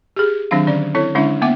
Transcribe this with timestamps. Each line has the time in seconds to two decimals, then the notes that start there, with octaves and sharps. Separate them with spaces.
0.16 G4 G#4
0.51 D#3 F#3 C4 D4 F5
0.67 D3 C#4 D5
0.95 C4 E4 A4 C#5
1.15 D3 G#3 C#4 D4 E4 E5
1.42 A#3 B3 E5 F#5 D6